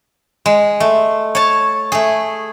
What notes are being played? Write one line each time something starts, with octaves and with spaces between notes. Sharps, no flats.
G#3
A3
C#5 A5
A3 G#4